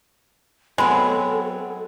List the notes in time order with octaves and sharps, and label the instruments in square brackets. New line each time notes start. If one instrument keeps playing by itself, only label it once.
[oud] F#3 B3 C4 [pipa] G#3 [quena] A4 [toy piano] C5 B5